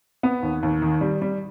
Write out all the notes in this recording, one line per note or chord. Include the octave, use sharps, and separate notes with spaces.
B3
D#2
D#2
D#3
G3
G3